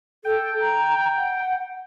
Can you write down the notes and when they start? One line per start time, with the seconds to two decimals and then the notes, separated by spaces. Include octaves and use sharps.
0.25 A4 G5
0.60 A#5
1.17 F#5